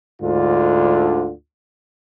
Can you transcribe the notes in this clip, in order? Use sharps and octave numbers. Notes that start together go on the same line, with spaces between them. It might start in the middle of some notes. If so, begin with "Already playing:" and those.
D2 G#2 D3 F4